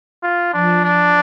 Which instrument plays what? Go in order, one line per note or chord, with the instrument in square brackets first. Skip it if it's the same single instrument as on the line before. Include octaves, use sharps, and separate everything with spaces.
[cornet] F4
[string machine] F3 [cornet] D4
[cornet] D4